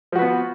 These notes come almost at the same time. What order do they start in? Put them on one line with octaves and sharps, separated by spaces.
F3 F#4 B4 B3